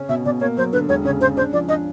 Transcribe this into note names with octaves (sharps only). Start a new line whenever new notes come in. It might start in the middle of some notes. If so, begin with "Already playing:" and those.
Already playing: C#3 C#4
B2 E5
B2 D5
A#3 C#5
F#3 C5
D3 B4
E1 C#5
C#3 C#5
C#3 C5
D4 C5
F3 D5
D4 D#5